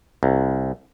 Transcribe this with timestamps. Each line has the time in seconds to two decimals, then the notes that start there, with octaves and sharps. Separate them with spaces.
0.23 C2